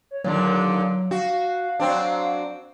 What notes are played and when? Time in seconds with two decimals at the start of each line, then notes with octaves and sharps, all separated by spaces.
0.11 C#5
0.24 D#2 A#2 D3 F#3
1.11 F#4 F5
1.79 F#3 C4 D4